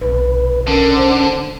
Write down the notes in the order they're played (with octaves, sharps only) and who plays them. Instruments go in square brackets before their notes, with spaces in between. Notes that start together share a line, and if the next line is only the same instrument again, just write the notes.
[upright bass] B1 C3 [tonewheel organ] B4
[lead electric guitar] D3 [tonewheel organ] C#4 [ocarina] A#4
[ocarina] C5